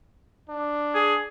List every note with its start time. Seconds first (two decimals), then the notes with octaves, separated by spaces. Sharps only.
0.50 D4
0.95 G#4